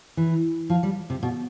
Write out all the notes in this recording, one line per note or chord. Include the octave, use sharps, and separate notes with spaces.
E3
F3
G3
C3
B2